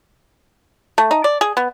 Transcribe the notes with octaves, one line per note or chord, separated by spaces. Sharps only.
A3
D#4
D5
G#4
B3